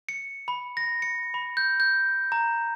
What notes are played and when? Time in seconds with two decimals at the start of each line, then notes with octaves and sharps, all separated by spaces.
0.09 C#7
0.48 B5
0.77 A#6
1.02 C#7
1.34 B5
1.57 G6
1.80 G6
2.32 A#5